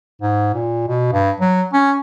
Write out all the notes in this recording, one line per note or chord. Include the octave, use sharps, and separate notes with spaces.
G#2
A#2
B2
G2
F#3
C#4